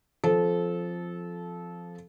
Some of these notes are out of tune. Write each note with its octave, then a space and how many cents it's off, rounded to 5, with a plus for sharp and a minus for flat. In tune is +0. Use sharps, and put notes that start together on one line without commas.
F3 +0 C4 +0 A4 -20